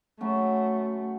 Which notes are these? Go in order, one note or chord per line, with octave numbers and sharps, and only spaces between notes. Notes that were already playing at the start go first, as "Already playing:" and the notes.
F#2 C#3 F#3 A3